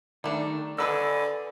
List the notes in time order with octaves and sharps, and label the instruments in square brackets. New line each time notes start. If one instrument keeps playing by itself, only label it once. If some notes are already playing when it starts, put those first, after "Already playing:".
[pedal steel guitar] D#3 [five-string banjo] G3 A3 D4
[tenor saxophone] D3 [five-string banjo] A4 B4 D#5 [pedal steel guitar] G#5 B5 E6